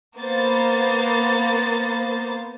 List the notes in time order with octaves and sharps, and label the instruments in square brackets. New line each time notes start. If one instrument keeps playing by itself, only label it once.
[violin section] A#3 B3 C5 A6